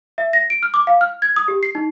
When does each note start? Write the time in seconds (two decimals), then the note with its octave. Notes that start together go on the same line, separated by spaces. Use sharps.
0.18 E5
0.33 A#6
0.50 D7
0.63 F6
0.74 D6
0.87 F5
1.01 F6
1.22 G#6
1.36 D#6
1.48 G4
1.63 C7
1.75 D#4